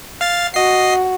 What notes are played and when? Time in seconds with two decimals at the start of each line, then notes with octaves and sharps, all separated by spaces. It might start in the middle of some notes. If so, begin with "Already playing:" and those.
0.21 F5 A6
0.54 F#4 D#5 C7